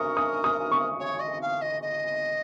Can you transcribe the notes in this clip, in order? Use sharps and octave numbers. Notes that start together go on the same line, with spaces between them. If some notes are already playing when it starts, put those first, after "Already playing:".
Already playing: A#4 C#6 D#6
D#6
D#6
C#6
C#5
D#5
F5
D#5
D#5